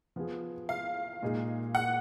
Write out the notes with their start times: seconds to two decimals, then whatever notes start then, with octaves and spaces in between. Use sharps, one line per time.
0.16 F3 B3 F4 G#4
0.69 F5
1.22 A#2 G#3 D#4 G#4
1.75 F#5